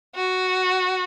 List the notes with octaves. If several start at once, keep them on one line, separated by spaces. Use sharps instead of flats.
F#4